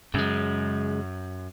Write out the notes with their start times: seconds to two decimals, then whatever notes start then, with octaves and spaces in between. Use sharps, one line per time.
0.14 F#2 C#3 G#3